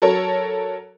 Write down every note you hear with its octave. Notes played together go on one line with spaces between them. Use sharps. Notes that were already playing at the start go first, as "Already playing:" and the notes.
F#3 A4 A#4 C#5